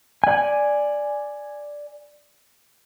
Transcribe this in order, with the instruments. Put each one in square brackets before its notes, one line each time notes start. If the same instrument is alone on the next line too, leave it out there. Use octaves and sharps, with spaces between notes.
[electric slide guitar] D5 G#5